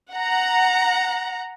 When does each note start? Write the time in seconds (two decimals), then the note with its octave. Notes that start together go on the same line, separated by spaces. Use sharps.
0.12 F#5 A#5